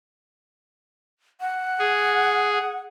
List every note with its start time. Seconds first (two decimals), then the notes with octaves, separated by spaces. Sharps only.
1.41 F#5
1.79 G#4